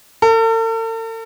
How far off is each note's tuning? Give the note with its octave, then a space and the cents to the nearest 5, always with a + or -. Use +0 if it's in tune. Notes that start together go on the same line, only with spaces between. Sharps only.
A4 +45